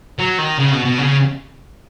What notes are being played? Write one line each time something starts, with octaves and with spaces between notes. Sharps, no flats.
F#3
D#3
C#3
B2
B2
C#3